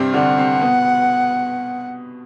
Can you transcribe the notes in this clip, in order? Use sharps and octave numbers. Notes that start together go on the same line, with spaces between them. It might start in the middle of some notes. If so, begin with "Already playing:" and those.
Already playing: G2 C3 G3 C4
D3 D4 F#5
C3 C4
B2 B3